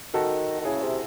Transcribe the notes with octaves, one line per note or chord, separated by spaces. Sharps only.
D#3 F#4 A4
D#3
C#3 E4 G#4
C3